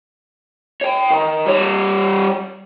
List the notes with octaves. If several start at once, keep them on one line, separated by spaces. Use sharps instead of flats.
C#5 G5
D#3
G3 C#5